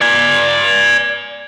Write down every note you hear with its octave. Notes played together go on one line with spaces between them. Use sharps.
D5 G#5